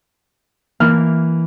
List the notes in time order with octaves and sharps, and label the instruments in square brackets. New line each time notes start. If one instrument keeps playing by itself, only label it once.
[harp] E3 [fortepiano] A#3 F6